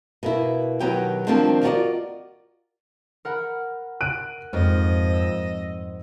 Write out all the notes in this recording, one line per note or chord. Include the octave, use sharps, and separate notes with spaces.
B2 A#3 E4
B2 D#3 F#3 B3 G4 G5
D#3 F3 G3 A#3 C4 D4
F4 F#4 A#4 C5 D5 D#5
A#4 F#5 B5
F#6 D7 D#7
F2 G#2 C4 D#5
E6